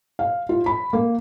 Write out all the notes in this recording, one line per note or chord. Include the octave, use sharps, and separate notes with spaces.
F5
F4
B5
A#3